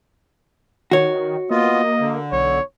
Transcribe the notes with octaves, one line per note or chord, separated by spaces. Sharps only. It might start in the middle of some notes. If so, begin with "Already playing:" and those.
D#3 F#4 C#5
A#3 B3 F4 D#5
D3
B1 C#5